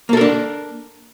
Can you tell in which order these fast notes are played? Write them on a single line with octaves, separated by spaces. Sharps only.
A#3 A4 A#4 D4